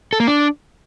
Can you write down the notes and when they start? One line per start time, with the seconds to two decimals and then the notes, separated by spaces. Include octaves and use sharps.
0.13 A4
0.20 A#3
0.27 D4